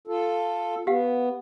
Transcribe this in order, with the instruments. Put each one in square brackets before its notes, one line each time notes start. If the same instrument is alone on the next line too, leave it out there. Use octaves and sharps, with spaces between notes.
[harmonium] F4 A4
[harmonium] B3 [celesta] G4 F5 F#5